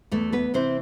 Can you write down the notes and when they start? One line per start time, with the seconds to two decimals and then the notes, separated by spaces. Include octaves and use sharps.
0.11 E2 A3 A4
0.33 B3 B4
0.54 C3 E3 C4 C5